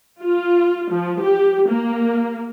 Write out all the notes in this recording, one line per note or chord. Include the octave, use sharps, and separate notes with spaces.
F4
F3
G4
A#3